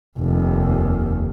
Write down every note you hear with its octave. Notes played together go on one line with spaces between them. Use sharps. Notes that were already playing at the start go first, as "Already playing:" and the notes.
F1 D#2